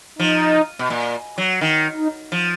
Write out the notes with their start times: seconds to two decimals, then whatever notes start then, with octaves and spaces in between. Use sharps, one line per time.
0.19 F3 D#4
0.79 B2
0.90 A#2
1.38 F#3
1.61 D#3
1.97 D#4
2.32 F3